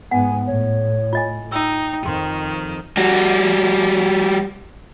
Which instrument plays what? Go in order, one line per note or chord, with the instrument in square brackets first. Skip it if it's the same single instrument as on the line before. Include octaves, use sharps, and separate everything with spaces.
[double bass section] G#2 B3 [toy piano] F#5 [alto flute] G#5
[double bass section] A2 [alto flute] C#5
[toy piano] F4 D#5 G#5
[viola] D#4 [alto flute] G5 [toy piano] E6
[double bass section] F2 [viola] D#3 [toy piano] C6
[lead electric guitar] G3 F#4